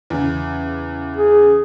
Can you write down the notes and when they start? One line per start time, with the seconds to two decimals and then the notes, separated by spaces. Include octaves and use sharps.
0.10 E2 C#3
1.17 G#4